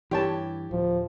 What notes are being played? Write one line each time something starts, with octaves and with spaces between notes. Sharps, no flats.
G2 E3 G4 C#5 A5
D1 F3